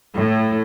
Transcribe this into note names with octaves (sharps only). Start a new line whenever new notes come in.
A2